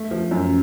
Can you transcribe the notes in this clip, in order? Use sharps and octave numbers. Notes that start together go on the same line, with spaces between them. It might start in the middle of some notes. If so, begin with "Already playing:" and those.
Already playing: A3
F3
F#2